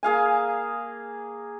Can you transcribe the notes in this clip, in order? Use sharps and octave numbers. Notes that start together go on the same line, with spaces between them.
A#3 G#4 F5 G#5